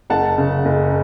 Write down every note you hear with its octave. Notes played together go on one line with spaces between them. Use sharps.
F#1 F#5 A5
C#3
F#1